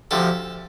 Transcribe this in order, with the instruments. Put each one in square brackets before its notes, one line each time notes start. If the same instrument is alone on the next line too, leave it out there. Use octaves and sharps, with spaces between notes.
[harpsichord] D2 C3 F3 A4